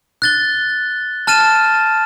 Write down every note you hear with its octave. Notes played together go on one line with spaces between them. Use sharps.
F#6 A6 G7
A5 F6 A6 D#7 E7